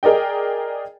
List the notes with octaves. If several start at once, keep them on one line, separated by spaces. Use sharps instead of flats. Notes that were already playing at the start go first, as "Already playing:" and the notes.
G#4 A#4 D5 D#5 G5